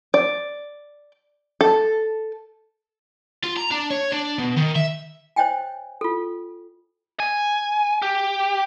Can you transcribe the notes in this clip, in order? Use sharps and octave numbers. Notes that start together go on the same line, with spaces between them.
D5
A4
F4
A#5
D4
C#5
D4
B2
D#3
E5
C5 C#5 D#5 G5 G#5
F4 A4
G#5
G4